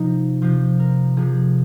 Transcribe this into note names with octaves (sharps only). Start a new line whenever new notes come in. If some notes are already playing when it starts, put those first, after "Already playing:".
Already playing: C3 F3 D#4
C3 F3 C5
A#4
C3 F3 G#4